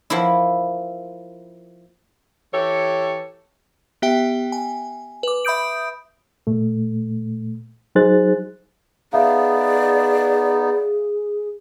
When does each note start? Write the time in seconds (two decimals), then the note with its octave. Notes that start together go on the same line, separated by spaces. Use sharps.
0.10 F3 A#3 E4
2.53 E3 G4 A4 C#5
4.02 B3 G4 E5 G5
4.52 G#5
5.23 B4 D6
5.45 E5 B5 D#6 G6 D7
6.47 A#2 A3
7.95 F#3 D#4 G#4 C5 F#6 A6
9.13 B3 D#4 G#4 D5 E5 F5